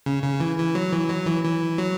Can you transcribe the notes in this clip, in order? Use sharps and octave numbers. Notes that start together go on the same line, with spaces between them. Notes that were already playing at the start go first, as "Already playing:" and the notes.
C#3
C#3
E3
E3
F#3
E3
F#3
E3
E3
F#3